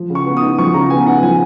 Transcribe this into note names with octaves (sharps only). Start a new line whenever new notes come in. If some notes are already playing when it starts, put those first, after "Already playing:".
Already playing: F3
C#3
C#6
B3
D#6
D#4
F3 C#6
C#3 A#5
B3 G#5
D#4 F#5
F3 G#5